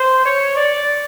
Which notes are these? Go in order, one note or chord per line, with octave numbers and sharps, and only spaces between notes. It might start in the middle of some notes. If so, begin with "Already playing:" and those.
Already playing: C5
C#5
D5